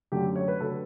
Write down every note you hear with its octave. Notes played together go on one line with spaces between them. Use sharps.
F#2 D3 F#3 A3 G4
C#5
B4
D3 F#3 A3 A4